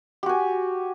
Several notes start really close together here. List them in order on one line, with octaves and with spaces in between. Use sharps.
G4 F#4 G#5